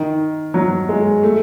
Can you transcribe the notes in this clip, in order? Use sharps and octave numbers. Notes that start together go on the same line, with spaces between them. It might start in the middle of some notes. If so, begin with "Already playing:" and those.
Already playing: D#3
F#3
G#3
A3